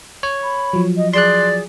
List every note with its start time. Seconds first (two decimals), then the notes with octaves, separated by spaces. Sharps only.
0.23 C#5
0.43 B5
0.73 F3 F#3
0.97 D#5
1.14 G#4 D5 C6 F#6